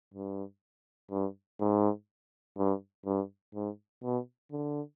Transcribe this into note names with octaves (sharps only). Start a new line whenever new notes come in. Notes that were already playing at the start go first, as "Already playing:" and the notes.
G2
G2
G#2
G2
G2
G#2
B2
D3